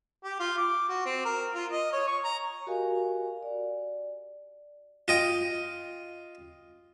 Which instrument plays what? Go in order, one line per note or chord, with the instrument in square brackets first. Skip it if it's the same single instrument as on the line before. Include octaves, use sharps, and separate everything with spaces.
[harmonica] G4
F4
D6
F#4
C4
A#4
F4
D#5
C#5
C#6
A#5
[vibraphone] F#4 G4 A#4 D#5 F5 G#5
D5
[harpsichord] F4 D#5 G5